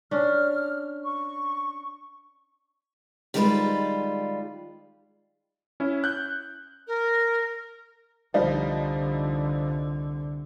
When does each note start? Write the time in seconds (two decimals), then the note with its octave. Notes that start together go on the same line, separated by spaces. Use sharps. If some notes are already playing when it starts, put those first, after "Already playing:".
0.11 C#4 D4 F6
1.03 C#6
3.34 D#3 G3 G#3 F4 A#4 B4
5.80 C#4 E4
6.04 F#6 G6
6.87 A#4
8.34 C2 D3 F3 G3 D#4